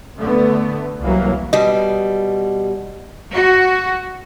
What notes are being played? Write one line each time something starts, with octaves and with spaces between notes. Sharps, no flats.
D3 A3 B3
C2 E3 F#3 A#3
B2 G3 D#5
F#4